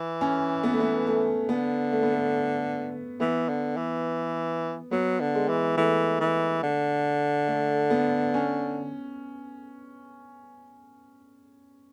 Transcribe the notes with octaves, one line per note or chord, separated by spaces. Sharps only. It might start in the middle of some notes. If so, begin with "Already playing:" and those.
Already playing: E3
C#4
B3
A3
B3
A3
D3 B3
A3
B3
A3
E3 B3
D3
E3
F#3 B3
D3
G#3
E3
E3 A3
E3
D3
A3
B3
C#4